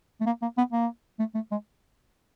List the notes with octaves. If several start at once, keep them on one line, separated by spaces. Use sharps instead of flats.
A3
A#3
A#3
B3
A#3
A3
A3
G#3